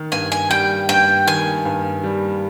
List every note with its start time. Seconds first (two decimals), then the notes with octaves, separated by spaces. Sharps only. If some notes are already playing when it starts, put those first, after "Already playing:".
Already playing: D#3
0.12 G2 G#5
0.32 G#5
0.50 G3 G5
0.89 G2 G5
1.27 D#3 G#5
1.65 G2
2.03 G3